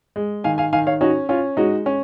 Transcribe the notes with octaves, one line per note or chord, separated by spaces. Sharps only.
G#3
D#3 F5 G#5
F5 G#5
D#3 F5 G#5
C#5 F5
C#4 D#4 F#4
C#4 F4
G#3 D#4 F#4
C#4